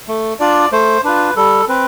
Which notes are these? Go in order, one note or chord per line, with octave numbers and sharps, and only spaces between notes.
A3
D4 F4 D5
A3 C5
D4 F4 B4
G3 A4
C4 B4